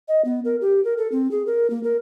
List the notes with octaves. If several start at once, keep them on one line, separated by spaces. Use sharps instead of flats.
D#5
B3
A#4
G4
A#4
A4
C4
G#4
A#4
A#3
A#4